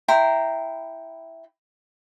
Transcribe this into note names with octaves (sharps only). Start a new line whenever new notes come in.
E4 G5 A#5 C6